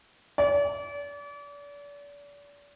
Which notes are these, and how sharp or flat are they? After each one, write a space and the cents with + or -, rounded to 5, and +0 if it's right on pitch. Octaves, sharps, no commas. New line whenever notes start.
D5 -40